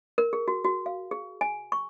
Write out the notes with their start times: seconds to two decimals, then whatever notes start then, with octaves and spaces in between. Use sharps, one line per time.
0.18 A#4
0.33 G#4
0.48 F#4
0.64 F#4
0.86 F5
1.11 G#4
1.41 G#5
1.72 C#6